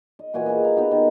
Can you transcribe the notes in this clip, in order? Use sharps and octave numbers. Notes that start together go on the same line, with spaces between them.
D#5
A#2 E3 F#4 G#5
G4 G#4 B4 D#5
F5 A#5
B3 D#4 F#4
D#3